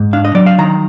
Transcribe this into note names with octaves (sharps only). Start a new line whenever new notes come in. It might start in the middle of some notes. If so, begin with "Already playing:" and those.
Already playing: G#2
D4 F5
D#5
F#3 D5
F5
D#3 A#5